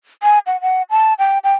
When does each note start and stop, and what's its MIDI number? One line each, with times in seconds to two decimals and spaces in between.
0.23 0.39 80
0.47 0.60 78
0.61 0.82 78
0.90 1.14 81
1.19 1.39 79
1.44 1.54 79